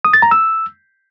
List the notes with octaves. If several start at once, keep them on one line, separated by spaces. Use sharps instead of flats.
D#6
A6
A#5
E6